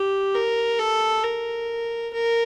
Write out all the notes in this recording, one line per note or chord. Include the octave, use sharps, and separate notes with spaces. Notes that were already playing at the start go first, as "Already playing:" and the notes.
Already playing: G4
A#4
A4
A#4
A#4